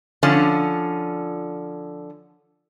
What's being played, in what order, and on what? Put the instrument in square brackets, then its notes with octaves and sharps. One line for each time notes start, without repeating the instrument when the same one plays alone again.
[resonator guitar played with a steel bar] D3 F3 C#4